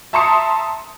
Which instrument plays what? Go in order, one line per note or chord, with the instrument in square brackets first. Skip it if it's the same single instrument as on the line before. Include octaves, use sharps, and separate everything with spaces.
[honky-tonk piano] E5 A5 A#5 C6 D#6 C#7